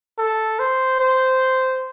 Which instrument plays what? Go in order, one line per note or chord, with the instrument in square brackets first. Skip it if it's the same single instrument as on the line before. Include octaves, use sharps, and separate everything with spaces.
[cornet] A4
C5
C5